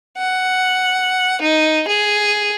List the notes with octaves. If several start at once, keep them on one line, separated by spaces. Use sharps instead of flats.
F#5
D#4
G#4